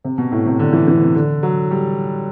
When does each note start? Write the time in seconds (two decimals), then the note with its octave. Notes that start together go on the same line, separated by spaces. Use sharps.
0.04 C3
0.18 B2
0.32 A2
0.46 C3
0.59 D3
0.73 E3
0.87 E3
1.02 C3
1.15 D3
1.43 F#3
1.71 G3